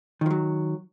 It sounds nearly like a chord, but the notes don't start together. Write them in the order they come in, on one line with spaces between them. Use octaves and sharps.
D#3 F3 F#3